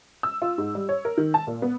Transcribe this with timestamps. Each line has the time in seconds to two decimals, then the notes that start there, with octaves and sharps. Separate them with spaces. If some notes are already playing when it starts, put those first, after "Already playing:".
0.23 E6
0.42 F4
0.58 G#2
0.75 G3
0.89 C#5
1.05 A#4
1.18 D#3
1.34 A5
1.47 A#2
1.62 B3